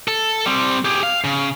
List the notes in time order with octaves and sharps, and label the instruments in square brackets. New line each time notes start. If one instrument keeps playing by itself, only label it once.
[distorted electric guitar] A4
G3 C4
G4 G#4
F5
C#3